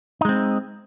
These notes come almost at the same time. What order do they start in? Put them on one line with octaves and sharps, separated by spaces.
D#4 G#3 C4